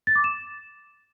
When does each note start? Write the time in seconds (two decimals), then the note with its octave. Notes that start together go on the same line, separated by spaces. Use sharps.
0.07 A6
0.16 D6
0.24 E7